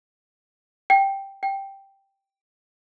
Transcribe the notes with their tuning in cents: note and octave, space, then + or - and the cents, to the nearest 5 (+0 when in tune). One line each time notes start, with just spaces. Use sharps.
G5 +0
G5 +0